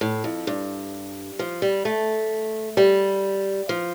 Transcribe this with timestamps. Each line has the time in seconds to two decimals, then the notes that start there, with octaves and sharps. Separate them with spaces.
0.01 A2
0.24 F2
0.47 G2
1.39 F3
1.62 G3
1.85 A3
2.77 G3
3.69 F3